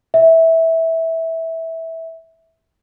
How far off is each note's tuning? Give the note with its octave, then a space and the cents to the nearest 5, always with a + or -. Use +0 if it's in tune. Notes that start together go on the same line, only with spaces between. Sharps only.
E5 -15